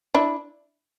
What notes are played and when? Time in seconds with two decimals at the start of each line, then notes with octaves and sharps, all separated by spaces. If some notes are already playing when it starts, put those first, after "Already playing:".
0.14 D4 E4